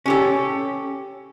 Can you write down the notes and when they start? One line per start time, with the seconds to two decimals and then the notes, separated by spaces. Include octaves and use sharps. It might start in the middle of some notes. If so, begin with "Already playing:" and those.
0.06 C#4 G4 A4